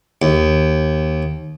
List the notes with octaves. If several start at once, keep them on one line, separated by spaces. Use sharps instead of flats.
D#2